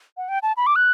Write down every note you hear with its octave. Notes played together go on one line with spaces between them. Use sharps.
F#5
G5
A5
B5
D6
F#6